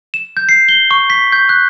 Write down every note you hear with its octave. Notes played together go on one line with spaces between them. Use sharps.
E7
G6
C7
G7
C#6
B6
G6
F#6